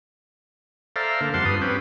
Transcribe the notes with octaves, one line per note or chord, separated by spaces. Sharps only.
A4 C5 D5 E5 F5 A#5
D3 A#3
F2 G3 C5 F#5 A5 C6
G2 F4 B4 D#6
C4 C#4 G4 B4